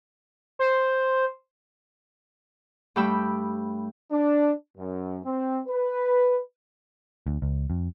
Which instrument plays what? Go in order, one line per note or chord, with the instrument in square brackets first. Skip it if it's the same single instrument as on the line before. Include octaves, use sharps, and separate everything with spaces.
[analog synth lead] C5
[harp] G2 A3 G4 G5 B5 E6
[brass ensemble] D4
F#2
C4
B4
[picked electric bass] D2
C#2
F2